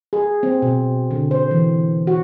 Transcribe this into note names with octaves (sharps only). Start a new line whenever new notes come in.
G#4
C4
B2
D3
C5
E3
F#4